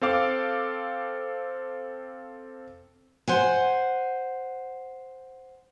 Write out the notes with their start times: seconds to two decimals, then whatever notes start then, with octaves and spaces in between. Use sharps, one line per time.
0.02 C4 A4 F5 D6
3.28 C5 F#5 G#5